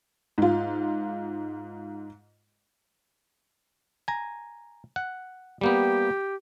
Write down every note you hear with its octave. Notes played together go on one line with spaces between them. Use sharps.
G#2 F4
G#5 A#5
F#5
G3 A#3 B3 G4